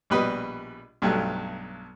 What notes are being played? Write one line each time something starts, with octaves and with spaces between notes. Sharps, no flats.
A#1 B2 G3 B4 D#5
B1 G2 F#3 A3